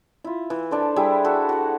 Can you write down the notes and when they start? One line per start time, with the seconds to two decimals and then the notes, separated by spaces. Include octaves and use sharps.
0.24 E4 F4
0.50 E3
0.71 D4 A4 C5
0.96 G3 E4 G#4 G#5
1.24 F#4 A4
1.49 F#4 F#5